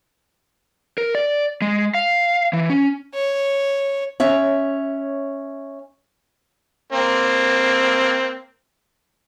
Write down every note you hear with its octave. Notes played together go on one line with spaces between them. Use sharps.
A#4
D5
G#3
F5
E3
C#4
C#5
C#4 C#5 E5
A#3 C4